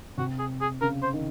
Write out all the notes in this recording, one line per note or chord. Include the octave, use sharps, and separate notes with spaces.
C3 F#4
G#4
G#4
C#3 A#4
C5
D#3